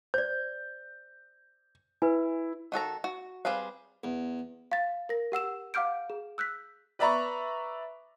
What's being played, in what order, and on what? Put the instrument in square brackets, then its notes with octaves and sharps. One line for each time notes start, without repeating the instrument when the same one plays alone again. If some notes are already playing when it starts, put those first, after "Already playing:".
[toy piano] C5 D5 [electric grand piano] G6
[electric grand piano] E4 [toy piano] B4 G#5
[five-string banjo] D#3 F#4 A4 A#5
F#4
G3 C4 G#4 B4 F5
[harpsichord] E2
[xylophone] F5 A6
A#4 A#6
G4 F#5 E6 E7
F5 F#5 D6 F6 G6 D7
G#4
E6 F#6 G6 B6
[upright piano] B4 D5 E5 A#5 B5 C#6